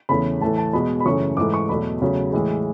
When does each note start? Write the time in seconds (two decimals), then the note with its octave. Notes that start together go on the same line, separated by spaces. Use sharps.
0.09 E2 C#3 E3 A3 B5
0.41 A2 E3 A3 A5
0.58 A5
0.73 E2 B2 G#3 B5
1.00 B5
1.05 F#2 C#3 E3 A3 C#6
1.37 G#2 E3 A3 D6
1.54 C#6
1.69 E2 B2 F#3 A3 B5
2.01 E2 C#3 F#3 A3
2.33 A2 E3 G#3